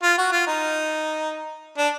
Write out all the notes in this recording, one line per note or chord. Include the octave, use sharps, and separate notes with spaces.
F4
F#4
F4
D#4
D4